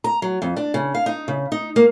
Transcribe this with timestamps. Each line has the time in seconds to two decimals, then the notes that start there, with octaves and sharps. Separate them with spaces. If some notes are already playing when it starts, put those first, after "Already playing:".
0.04 A#5
0.22 F#3
0.42 F2
0.56 D4
0.74 C#3
0.95 F5
1.06 D#4
1.28 C#3
1.52 D#4
1.76 A#3